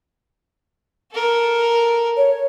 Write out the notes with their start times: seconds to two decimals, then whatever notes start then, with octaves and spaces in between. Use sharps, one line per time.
1.12 A4 A#4
2.17 C#5